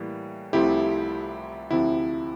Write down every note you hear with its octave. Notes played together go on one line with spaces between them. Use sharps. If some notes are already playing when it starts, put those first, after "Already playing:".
Already playing: A2 E3 G3 A#3
C2 C3 F3 A3 C4 E4 G4
D2 C3 F3 C4 E4